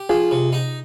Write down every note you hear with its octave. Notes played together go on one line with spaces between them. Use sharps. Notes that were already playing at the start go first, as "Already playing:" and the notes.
Already playing: G4
F3 F4 G#4
C3
D#4